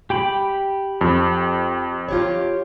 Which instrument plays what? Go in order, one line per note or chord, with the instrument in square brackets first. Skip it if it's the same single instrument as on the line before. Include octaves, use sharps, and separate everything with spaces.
[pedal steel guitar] G4 G5 B5
[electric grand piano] F2
[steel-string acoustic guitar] F4 G4 C#5